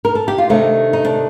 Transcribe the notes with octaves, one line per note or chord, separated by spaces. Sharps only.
A#4
A4
G4
F4
C3 D#3 A3 D4 D#4
D#4
D4